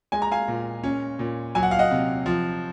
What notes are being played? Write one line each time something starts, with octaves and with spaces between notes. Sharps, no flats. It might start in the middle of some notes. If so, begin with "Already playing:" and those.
G#3 G#5
A#5
F5 G#5
A#2
C#4
A#2
F#3 G#5
F#5
F5
D#5 F#5
C3
F3